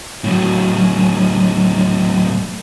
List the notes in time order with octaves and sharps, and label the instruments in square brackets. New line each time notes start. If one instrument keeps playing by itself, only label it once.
[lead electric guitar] A2 F#3